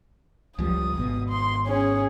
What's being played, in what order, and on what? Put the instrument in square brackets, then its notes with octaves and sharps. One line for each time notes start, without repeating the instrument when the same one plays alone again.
[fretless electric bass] C#2 F3 G3 [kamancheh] D#6
[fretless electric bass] G#1 B2
[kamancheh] C6
C#4 G#4